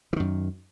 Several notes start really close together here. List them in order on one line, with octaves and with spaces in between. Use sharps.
E3 D#3 F#2